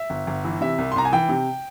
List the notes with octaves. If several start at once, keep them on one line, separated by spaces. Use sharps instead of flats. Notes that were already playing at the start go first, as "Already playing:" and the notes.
Already playing: E5
G1
G1
E3
C3 E5
C2
C6
C2 A#5
G#5
E3 G5
C3